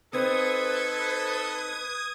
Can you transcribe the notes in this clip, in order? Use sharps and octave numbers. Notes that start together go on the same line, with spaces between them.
C4 D#4 A4 B4 C5 D#6 G#6